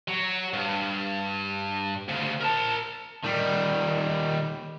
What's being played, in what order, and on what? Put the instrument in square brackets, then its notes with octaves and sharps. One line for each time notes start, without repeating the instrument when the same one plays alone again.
[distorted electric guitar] F#3
G2
D2 C#3
A#4 A5
[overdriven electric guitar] D#3 G3